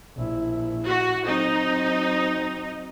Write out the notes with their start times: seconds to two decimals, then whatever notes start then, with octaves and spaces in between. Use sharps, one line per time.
0.17 A#1 E4
0.85 F#4
1.26 F#3 C4 D#4